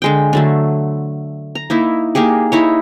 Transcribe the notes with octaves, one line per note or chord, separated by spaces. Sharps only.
D3 G#3 G5
D3 F#3 A3
A#5
A#3 D#4 E4
A#3 D#4 G4 G#4
D#4 E4 C#5